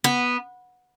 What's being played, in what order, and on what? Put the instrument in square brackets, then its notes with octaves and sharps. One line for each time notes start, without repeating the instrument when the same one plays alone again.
[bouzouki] B3